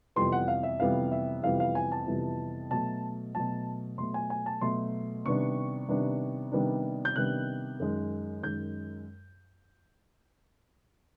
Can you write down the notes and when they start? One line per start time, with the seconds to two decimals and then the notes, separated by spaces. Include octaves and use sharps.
0.16 F2 C3 E3 G3 B3 C6
0.32 F#5
0.48 F5
0.63 E5
0.80 F2 C3 E3 G3 B3 F5
1.12 E5
1.43 F2 C3 E3 G3 B3 F5
1.60 F5
1.75 G#5
1.92 A5
2.07 F2 C3 E3 G3 B3
2.70 B2 F#3 A3 A5
3.35 B2 F#3 A3 A5
3.98 B2 F#3 A3 C6
4.14 G#5
4.30 G#5
4.46 A5
4.61 B2 F#3 A3 C6
5.25 C3 D#3 G3 B3 D4 C#6
5.89 C3 D#3 G3 B3 D4
6.52 C3 D#3 G3 B3 D4
7.05 G6
7.16 C3 D#3 G3 B3 D4 F#6
7.80 F#2 D#3 G#3
8.42 F#2 D#3 G#3 G6